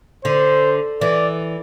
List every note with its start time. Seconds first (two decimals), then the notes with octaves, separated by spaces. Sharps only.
0.24 D3 C5
1.01 E3 D5